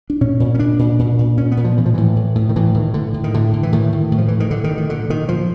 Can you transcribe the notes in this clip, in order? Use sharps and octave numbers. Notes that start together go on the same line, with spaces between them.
D4
A#2 C#4
A#2
C#4
A#2 D4
A#2
A#2
A#2
A#2 C#4
B3
A#2
F3
A2 E3
F3
A2 E3
A2
A2
D#3
A2 E3
A2 D#3
A2 D3
A2
D#3
A2 D3
A2
E3
A2 D#3
A2
A2
F3
A2 E3
D#3
A2 D3
D#3
A2
D#3
A#2 D3
A#2 D#3
A#2 F3